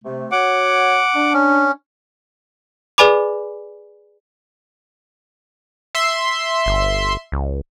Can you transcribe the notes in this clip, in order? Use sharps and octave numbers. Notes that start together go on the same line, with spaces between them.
C3 A3
F#4 C#5 F#5 D6
D4
C#4
G#4 B4 D5 G#5 B5 D6
E5 C6
G1
C#2